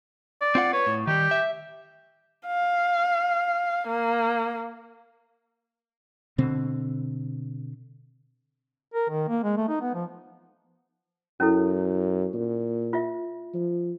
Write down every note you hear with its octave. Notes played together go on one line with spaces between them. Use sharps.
D5
C4 F4 F#5
B4 C#5
A2
D#3 G3 G4
E5
F5
A#3
B2 D3 C4
A#4
D#3
A#3
G#3
A3
D#4
B3
F3
F#2 C#4 E4 A4
A#2
F4 E5
F3